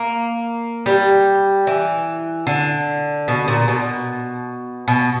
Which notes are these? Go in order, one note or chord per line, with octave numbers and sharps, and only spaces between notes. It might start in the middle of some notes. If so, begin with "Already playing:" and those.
Already playing: A#3
G3
E3
D3
B2
A#2
B2
B2